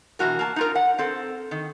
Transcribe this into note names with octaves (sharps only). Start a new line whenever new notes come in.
B2 E3 G#3 F#4 A#4
A#3 A5
D#4 F4 A#4
F#5
C4 A4
D#3